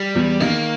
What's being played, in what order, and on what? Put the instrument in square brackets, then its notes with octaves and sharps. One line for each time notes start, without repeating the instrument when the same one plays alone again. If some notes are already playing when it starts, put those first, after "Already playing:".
Already playing: [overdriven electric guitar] G3
[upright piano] E2
[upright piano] D#3 [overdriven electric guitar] A#3